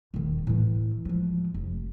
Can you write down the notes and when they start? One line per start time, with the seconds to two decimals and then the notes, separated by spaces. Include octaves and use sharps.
0.14 D#1 D#3
0.47 A2 E3
1.05 F3 G#3
1.54 F1